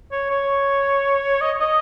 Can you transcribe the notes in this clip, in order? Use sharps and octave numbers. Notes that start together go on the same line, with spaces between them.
C#5
C#5
D#5
D#5